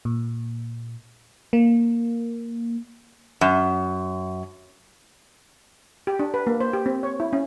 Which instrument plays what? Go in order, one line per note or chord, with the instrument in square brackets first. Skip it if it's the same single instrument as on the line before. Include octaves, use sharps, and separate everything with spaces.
[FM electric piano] A#2
A#3
[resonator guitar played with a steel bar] F#2
[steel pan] G4
D4
B4
A#3
C5
G4
C4
C#5
E4
C#4